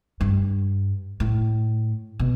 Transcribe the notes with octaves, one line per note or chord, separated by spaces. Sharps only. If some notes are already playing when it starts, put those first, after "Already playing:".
G2
A2
B2